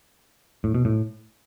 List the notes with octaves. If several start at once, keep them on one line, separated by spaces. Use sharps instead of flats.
A2
B2
A2